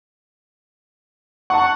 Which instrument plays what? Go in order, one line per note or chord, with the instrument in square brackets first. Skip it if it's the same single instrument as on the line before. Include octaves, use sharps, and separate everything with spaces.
[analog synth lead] F#5 [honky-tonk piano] A5 A#5 C#6